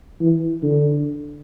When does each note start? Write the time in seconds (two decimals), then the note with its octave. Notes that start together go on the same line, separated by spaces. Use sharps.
0.21 E3
0.63 D3